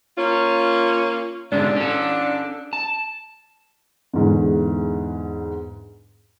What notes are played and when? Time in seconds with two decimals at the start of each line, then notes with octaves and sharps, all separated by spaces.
0.17 A#3 C#4 F4
1.52 G#2 D3 C#4 D4
1.76 C#4 A4
2.73 A5
4.13 E2 G#2 D3